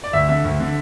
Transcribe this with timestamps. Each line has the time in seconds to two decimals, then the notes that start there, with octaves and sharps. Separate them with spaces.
0.04 D5
0.13 D2 E5
0.29 D3 E5
0.44 D2
0.60 D3